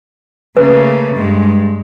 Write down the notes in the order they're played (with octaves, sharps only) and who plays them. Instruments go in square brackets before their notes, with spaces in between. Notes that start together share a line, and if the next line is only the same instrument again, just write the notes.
[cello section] C#3 A3 A#3 [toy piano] B4
[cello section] G2 G#3